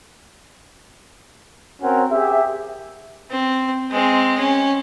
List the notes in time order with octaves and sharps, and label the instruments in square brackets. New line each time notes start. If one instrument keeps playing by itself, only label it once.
[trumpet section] C4 C#4 F#4 A#4 F#5
G4 G#4 E5
[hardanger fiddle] C4
G#3 C4
C#4